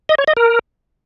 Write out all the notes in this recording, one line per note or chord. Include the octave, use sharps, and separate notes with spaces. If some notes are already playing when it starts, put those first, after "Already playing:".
D#5
C#5
D#5
A#4